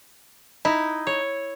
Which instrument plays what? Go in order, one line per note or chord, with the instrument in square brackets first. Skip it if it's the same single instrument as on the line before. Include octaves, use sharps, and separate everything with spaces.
[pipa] D#4 [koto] E4
[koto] C#5